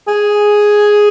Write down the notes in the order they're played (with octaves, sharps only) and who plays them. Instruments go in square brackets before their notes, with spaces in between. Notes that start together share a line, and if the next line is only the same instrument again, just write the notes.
[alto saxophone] G#4